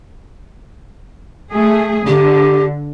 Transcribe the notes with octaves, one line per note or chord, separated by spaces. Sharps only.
A3 G#4
D3 G4